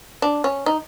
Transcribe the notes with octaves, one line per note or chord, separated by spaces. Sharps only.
D4
C#4
D#4